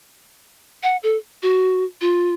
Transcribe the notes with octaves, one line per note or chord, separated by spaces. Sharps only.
F#5
A4
F#4
F4